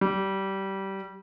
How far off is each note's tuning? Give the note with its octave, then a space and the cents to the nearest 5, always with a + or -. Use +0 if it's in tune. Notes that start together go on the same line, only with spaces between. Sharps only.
G3 -20